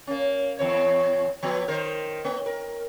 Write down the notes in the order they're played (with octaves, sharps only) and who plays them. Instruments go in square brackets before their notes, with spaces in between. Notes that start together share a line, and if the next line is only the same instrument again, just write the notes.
[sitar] A#3 C#4
E2 C4 C#5
F3 B3
D#3 A#4 C5
A#3
A#4